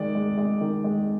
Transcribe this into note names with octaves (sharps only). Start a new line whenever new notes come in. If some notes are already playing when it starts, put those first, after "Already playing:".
Already playing: D#3 G#3 D5
G#3
G#3
D#3
G#3